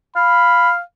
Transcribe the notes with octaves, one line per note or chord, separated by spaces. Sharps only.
F5 B5